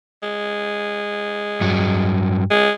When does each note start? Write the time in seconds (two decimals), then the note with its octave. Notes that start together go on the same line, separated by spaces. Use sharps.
0.23 G#3
1.61 G2 F#3
2.51 G#3